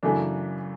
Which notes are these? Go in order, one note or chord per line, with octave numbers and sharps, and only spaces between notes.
F#2 C#3 E3 A3 D4